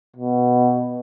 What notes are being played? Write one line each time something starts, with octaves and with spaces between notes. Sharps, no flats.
B2